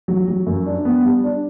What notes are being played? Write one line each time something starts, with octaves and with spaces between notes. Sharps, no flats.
F#3
F#3
F#2
D4
B3
G3
D4